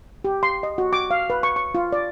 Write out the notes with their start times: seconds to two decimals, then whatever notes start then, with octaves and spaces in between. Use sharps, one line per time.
0.24 G4
0.43 C6
0.63 D#5
0.78 F#4
0.93 D6
1.11 F5
1.30 B4
1.43 C#6
1.56 C#6
1.75 F4
1.92 D5